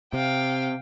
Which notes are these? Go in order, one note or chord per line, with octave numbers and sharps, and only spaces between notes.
C3 F5 G5